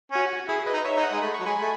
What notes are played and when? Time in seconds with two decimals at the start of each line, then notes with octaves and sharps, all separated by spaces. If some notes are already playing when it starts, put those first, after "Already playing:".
0.12 C#4 F#4
0.48 E4 G#4
0.66 B4 D#5
0.73 D#4
0.85 C#5 E5
0.97 D#4
1.03 D#5 F#5
1.12 G#3
1.22 A3 B5
1.34 C#6
1.40 F#3
1.45 G#3 G#5 B5
1.61 A3